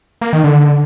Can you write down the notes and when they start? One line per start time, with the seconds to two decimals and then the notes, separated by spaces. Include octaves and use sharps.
0.21 A#3
0.33 D#3
0.44 D3